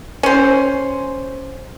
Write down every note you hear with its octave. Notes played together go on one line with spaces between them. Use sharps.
C#4 C5